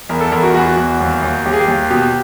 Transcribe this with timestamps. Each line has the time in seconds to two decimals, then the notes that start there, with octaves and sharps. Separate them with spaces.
0.09 E2 A#4
0.21 A4
0.32 E2 A#4
0.43 F#4
0.54 E2 F#4
0.77 E2
1.01 D#2
1.22 D#2
1.46 D#2 G4
1.53 G#4
1.60 G4
1.68 D#2
1.90 B2 G4